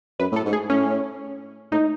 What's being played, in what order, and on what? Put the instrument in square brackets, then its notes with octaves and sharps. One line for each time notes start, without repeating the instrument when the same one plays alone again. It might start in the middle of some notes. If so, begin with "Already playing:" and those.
[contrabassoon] F#2 [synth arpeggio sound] B4
[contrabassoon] A2 [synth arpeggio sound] A4
[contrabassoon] G#2
[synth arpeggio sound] G#4
[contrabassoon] A2 [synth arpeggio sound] C#4
[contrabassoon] A2 [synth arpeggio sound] D#4